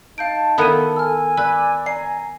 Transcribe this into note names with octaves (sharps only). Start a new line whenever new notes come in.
D#4 F5 A5 G6 D7
D#3 B3 E4 A4 A#4 D#7
G#5 E6 F6
B4 D5 E6
G#5 A#5 C7